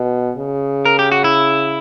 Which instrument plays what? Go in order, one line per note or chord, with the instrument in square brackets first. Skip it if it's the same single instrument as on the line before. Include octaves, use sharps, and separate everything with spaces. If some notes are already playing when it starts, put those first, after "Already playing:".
Already playing: [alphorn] B2
C#3
[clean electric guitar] A#4
G4
F#4
E4